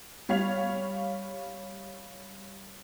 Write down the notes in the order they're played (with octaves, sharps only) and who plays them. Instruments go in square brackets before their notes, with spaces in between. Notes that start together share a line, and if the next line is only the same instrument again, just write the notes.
[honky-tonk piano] G3 C#5 F5 G#6 F7